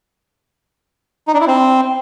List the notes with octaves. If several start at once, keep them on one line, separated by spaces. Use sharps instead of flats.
D#4
D4
E4
C4